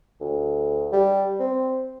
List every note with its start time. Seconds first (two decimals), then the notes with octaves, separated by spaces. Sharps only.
0.20 D2
0.92 G3
1.40 C4